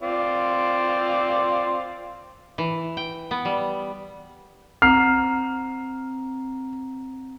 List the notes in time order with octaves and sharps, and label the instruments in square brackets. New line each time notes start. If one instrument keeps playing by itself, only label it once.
[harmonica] C4 F4 D5
[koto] E3
G5
B3
G3
[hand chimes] C4 A#5 [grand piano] F6 C7